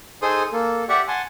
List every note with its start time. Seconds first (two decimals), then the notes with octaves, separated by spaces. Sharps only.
0.22 D#4 G#4 A4 C5 C6 D#6
0.53 A#3 A4
0.89 G4 D5 E5 F#5 C#6
1.08 F#5 G#5 A5 C6